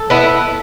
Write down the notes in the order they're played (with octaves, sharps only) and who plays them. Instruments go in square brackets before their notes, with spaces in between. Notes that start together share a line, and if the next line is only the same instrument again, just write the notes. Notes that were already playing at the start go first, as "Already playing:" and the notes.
Already playing: [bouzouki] A4
B3 E4